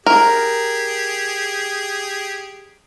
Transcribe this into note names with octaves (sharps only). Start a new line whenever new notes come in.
G4 G#4 A#4